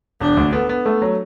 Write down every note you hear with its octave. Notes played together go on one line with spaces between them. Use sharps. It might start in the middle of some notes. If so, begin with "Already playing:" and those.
E1 D4
D2
B3 A4
B3
A3
F#3